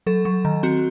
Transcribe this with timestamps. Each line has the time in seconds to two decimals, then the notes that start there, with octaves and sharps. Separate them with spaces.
0.06 F#3 A4
0.25 F#3
0.45 D#3
0.63 C4 F#4